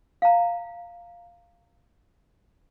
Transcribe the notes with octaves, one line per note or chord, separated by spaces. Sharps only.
F5 A#5